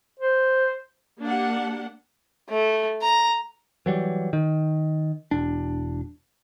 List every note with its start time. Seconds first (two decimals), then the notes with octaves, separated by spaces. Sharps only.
0.19 C5
1.21 A#3 D4 G4 F#5
2.49 A3
3.02 A#5
3.86 E3 F#3 G3
4.33 D#3
5.31 E1 D4